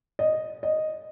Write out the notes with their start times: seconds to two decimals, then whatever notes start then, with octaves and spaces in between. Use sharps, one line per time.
0.19 D#5
0.63 D#5